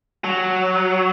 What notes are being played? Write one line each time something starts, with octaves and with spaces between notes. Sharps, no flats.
F#3